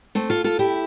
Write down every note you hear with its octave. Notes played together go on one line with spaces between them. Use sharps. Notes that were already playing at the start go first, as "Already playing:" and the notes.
A3 C4
F4 A4
F4 A4
E4 G4